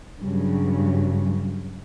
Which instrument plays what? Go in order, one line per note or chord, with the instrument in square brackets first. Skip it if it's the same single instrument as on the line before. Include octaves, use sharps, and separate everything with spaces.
[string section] G2 C#3 F#3